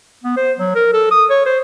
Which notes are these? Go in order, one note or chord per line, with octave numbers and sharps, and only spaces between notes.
B3
C5
F#3
A#4
A4
D#6
C#5
C5